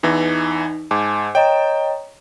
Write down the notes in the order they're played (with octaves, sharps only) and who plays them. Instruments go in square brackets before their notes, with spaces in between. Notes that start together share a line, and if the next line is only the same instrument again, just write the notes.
[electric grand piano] E2 E3 [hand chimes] D#4
[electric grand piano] G#2 [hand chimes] G#5 A5 D6
[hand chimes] C#5 D#5 A#5 [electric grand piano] G5